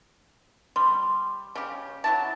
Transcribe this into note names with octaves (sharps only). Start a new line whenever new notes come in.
G3 C6
C#3 G4
F#3 E4 A5